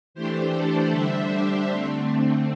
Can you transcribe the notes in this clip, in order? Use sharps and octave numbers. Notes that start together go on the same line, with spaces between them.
E3 A3 D4 G4 C5
A4 D5
D3 G3 D4 C5 E5
G4 C5
D3 A3 C4